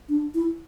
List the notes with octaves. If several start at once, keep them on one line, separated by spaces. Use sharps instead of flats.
D4
E4